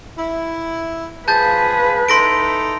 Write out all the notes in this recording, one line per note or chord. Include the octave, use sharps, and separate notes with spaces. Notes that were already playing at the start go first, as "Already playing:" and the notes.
E4
F3 F4 G#4 B4 A5 G6 A6
D#4 E4 A4 C6 A#6 D7